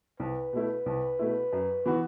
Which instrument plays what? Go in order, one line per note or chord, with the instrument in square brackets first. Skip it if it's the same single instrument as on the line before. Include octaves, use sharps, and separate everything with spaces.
[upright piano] C2 [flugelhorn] B4
[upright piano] B2 A3 E4
C2
B2 A3 E4
F#2
E3 B3 F#4